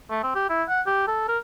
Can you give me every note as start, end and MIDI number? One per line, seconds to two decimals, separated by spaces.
0.11 0.23 57
0.23 0.34 60
0.35 0.48 67
0.50 0.63 64
0.69 0.82 78
0.86 1.07 67
1.07 1.27 69
1.28 1.38 70